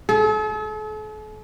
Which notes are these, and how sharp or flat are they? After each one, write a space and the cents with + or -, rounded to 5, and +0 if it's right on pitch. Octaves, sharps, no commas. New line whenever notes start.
A4 -45